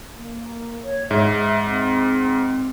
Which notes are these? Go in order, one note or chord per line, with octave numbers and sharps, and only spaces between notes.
A#3
C#5
G#2 E5
C4